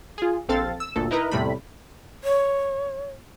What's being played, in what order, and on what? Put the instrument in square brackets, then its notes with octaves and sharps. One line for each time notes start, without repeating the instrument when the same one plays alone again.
[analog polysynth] F4 G#4
A#1 C4 A4 F5 A6
E6
G1 D2 A#2 A4
D#4 E4 A#4 B4 D#5 A#5
E2 A2 C3 G3 A3 B5
[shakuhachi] C#5